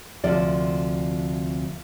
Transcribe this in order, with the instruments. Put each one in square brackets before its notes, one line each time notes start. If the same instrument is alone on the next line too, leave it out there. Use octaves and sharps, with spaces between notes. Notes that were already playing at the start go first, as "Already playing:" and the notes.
[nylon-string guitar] D2 C3 F3 D5